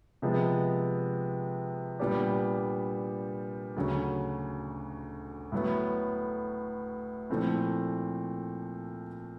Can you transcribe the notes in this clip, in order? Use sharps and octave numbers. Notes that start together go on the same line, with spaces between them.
C3 F3 G#3 B3
A#2 G3 B3 D4 G4
D2 C#3 F#3
A2 F#3 B3
A#2 F3 A3 C4 E4